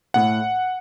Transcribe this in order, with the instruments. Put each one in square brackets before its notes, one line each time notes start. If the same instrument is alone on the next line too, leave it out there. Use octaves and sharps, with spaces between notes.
[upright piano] A2 [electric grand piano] F#5